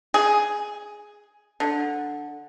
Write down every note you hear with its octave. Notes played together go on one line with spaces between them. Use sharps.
G#4
D3